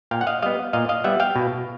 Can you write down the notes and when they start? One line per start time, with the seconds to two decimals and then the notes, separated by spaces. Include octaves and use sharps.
0.11 A#2 F5 G5
0.21 F#5
0.27 D#5 F5
0.42 G3 B3 D#5 F5
0.73 A#2 D#5 F5
0.89 D#5 F5
1.04 G3 B3 E5 F#5
1.20 F5 G5
1.36 B2